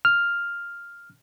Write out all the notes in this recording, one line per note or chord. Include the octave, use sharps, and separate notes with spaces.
F6